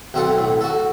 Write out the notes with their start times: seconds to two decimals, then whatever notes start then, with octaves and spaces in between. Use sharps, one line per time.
0.14 B1 C4 A4 F#5
0.38 A2
0.61 F#4 A4